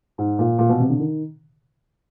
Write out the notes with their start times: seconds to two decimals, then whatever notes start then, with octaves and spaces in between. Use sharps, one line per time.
0.18 G#2
0.39 A#2
0.58 A#2
0.69 B2
0.80 C3
0.90 D3
1.00 D#3